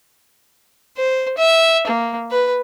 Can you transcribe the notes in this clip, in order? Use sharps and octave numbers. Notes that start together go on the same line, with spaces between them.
C5
E5
A#3
B4